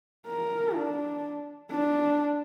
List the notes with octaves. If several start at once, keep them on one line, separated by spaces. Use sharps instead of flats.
A#4
D4
D4